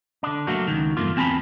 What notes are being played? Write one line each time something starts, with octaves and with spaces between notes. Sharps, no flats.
D3 D4
F#3 A3 A#3 F#4
C#2 D#3
E2 G2 A3 A#3 F4
E2 C4 G#5 A5 B5